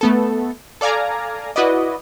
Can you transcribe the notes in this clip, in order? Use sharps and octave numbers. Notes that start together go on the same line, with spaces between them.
A3 B3 A4
A4 D5 F5 G#5 A#5
E4 F#4 B4 D5 D#5